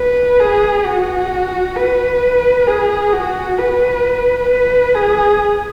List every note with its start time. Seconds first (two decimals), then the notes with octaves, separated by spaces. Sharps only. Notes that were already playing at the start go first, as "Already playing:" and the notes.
Already playing: B4
0.40 G#4
0.85 F#4
1.76 B4
2.67 G#4
3.13 F#4
3.58 B4
4.50 B4
4.94 G#4